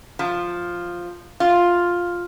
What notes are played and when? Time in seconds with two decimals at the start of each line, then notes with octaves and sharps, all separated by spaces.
0.19 F3
1.40 F4